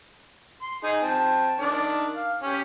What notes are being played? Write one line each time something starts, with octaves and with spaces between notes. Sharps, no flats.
C6
D#4 G#4
C4 A5
D#3 D4 D5
F5
C#4 G4